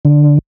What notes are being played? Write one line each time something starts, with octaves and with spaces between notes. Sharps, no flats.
D3